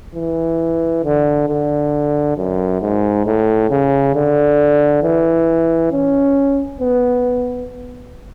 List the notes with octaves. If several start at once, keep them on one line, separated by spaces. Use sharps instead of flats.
E3
D3
D3
F#2
G#2
A2
C#3
D3
E3
C#4
B3